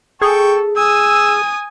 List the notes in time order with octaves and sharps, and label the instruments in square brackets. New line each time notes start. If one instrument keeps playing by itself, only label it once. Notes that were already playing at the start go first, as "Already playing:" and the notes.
[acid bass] G#4 [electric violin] A4 [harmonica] G5 C#6
[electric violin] G#5 D#6 [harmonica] E6